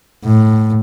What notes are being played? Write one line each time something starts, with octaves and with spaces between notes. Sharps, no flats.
A2